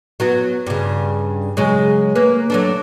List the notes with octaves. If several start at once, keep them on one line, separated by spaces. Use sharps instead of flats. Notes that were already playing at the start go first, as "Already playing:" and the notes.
F#3 B3 F#4
G2 C#3
C#3 F#3 G#3
A#3 B4 C#5
F#3 A3 D4